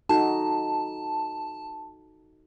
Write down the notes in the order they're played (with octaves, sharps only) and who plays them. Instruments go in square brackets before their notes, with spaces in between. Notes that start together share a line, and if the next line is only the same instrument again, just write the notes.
[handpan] D#4 F#4 A4 [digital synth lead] A5